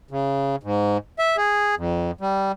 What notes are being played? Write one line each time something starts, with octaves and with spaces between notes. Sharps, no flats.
C#3
G#2
E5
G#4
F2
G3